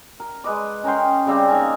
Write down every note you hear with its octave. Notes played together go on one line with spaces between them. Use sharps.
A#4
G#3 B4 D#5 D6
C#4 A#4 G5 C6
C#3 G3 C4
A#3 D#4 A#4 G#5